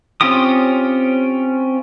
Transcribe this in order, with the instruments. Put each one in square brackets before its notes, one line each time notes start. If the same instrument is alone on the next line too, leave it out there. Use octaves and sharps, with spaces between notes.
[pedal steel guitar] C4 C#4 F4 G4 D#6